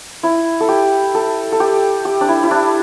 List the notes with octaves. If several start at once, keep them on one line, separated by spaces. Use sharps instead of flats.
E4
A4
G4
A4
A4
G4
G4
D4
E4
E4
D4